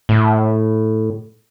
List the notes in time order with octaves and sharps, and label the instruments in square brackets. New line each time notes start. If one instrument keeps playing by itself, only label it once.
[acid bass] A2